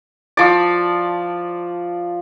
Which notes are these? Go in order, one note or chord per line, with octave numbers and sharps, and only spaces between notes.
F3 D5